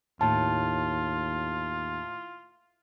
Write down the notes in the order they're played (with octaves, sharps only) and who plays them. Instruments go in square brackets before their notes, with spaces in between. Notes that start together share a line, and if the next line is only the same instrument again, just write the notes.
[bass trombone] D#2 [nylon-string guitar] A2 [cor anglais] F4 [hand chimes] A5